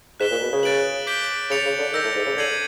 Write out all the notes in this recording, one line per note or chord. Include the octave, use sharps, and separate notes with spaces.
G#2 F#6 B6 E7 G7
A#2
B2
C#3
F#6 A6 D7 F#7
D6 G6 B6 D7 G7
C#3 A6 C#7 F7
C#3
D3
D#3 E6 G6 A#6
A2
G#2
C#3
D3 E6 G#6 C7 D#7 F#7